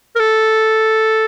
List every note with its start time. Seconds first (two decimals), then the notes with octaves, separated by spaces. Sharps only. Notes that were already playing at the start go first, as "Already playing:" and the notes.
0.16 A#4
0.20 A4